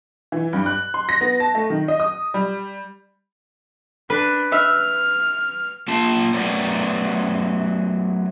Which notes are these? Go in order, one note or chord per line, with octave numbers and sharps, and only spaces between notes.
E3
G2
F#6
C6
A#6
B3
A5
A3
D#3
D#5
D#6
G3
D4 B4
E5 F6
A#3 F4 A5
F#3 A3 B3 A#4 C#5 D5